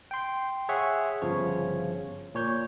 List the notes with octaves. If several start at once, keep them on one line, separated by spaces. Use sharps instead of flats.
G5 C6
G#4 C#5 E5 F#5
G1 C#3 F3 C#5
A#2 C#5 G6